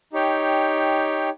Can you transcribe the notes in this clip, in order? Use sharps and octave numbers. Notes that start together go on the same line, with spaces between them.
D#4 G4 C#5 G5